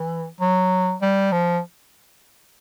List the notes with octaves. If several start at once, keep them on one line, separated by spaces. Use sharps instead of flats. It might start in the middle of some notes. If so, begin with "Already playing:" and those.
Already playing: E3
F#3
G3
F3